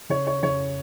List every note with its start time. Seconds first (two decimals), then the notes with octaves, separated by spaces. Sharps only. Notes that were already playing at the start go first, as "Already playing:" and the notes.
0.09 C#3 C#5
0.27 C#5
0.43 C#3 C#5